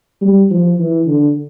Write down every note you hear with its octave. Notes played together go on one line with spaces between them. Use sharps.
G3
F3
E3
D3